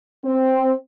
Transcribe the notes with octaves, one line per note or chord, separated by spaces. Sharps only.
C4